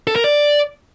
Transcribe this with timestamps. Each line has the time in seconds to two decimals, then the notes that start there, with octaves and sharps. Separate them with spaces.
0.07 A4
0.16 A#4
0.24 D5